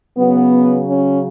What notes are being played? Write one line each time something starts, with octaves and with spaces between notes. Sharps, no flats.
C#3 F#3 B3
C#4